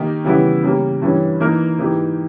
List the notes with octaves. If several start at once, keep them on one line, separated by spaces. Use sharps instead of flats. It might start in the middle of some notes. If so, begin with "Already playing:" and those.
Already playing: D#3 A#3 D#4 G4
C#3 E3 G3 B3 E4
C#3 G3 A#3
G2 E3 G3 C#4
E3 A#3 D#4 A#4
G#2 E3 A#3 D#4 G4